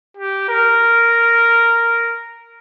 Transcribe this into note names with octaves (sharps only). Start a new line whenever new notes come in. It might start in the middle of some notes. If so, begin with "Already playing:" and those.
G4
A#4